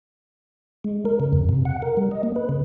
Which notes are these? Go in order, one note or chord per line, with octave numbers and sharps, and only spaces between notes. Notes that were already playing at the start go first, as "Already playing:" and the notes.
G#3
A#4
C#3
F2
C3
F#5
A#4
G3
D#5
A#3
B4
C#3